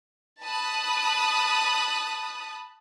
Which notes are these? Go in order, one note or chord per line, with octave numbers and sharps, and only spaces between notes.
A5 B5 D#6 F#6